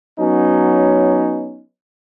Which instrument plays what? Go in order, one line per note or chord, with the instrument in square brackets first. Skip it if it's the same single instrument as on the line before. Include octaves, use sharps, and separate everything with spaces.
[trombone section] F#3 B3 C#4 D#4